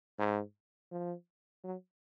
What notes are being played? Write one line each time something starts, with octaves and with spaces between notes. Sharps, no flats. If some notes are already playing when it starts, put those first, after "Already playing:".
G#2
F3
F#3